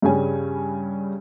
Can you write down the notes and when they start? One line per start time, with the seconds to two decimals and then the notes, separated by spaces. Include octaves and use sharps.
0.02 G2 C#3 G3 C#4 G#5